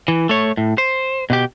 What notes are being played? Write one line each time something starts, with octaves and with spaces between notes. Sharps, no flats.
E3
A3 C#5
A2
C5
B2 G4